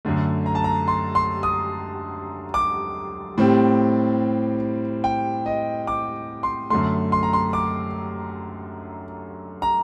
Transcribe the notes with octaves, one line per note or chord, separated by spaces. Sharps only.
F#2 D3 A3
A#5
A5
A#5
C6
C6
D#6
D6
A2 G3 C4
G5
D#5
D6
C6
F#2 D3 A3 C6
C6
A#5
C6
D6
A#5